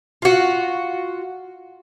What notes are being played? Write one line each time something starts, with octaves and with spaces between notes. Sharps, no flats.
F4 F#4